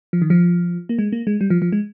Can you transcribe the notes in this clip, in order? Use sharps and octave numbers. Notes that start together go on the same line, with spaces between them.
F3
D#3
F3
A#3
G#3
A#3
G#3
G3
F3
F3
G#3